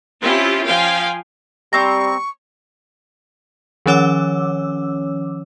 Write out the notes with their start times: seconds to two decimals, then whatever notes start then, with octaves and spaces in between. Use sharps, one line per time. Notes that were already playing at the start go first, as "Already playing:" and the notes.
0.21 C4 C#4 E4 F4 G4
0.67 F3 F5 G5 G#5
1.73 G3 C4 A#5 C#6
3.86 D#3 F3 C#4 C#5 D6 E6